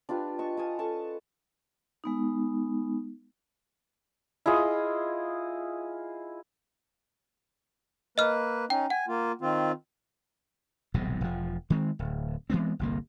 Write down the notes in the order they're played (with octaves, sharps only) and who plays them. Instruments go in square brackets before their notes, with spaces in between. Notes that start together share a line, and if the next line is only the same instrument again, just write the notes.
[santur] D4 F4 G4 B4
D#5 A5 C#6
F5 G#5 A5 D#6
C#4 A4 A5 C#6
[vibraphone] G#3 B3 D#4
[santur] E4 F4 G#4 D#5
[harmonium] A#3 B4 [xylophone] D#5 F6
[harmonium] C#4 D#4 [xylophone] G5
[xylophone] F#5 [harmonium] G#5
[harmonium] A#3 F4
D#3 C4 F4
[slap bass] D#1 B1 G#2 C3
E1 F3
D#3 G#3 C4
D1
E3 G#3 B3 C4
G1 C2 A#3